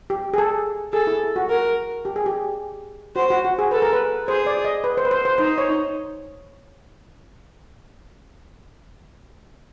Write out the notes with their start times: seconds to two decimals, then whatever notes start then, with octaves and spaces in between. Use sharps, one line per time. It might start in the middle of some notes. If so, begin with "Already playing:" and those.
0.10 G4
0.34 G#4
0.38 A4
0.93 G#4 A4
1.07 E4
1.36 F#4
1.50 A#4
2.05 G4
2.16 G#4
2.26 G4
3.16 F#4 C5
3.30 F#4
3.45 F#4
3.59 G#4
3.71 A4 B4
3.82 A#4
3.93 B4
4.28 G#4 C5
4.46 D5
4.65 D#5
4.84 B4
4.97 C5
5.05 B4
5.11 C5
5.25 C5
5.38 D#4 C5
5.58 C#5